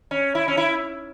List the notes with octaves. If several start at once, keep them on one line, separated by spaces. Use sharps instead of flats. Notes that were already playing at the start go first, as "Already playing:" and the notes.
C#4
E4
C#4
E4